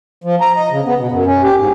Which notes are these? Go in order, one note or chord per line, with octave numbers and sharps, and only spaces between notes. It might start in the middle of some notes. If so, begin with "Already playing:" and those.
F3
A#5
D#5
C#3
B3
B2
F#2
C#4
G4
G#2